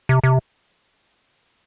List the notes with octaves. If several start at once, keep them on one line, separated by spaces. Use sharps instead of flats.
C3
C3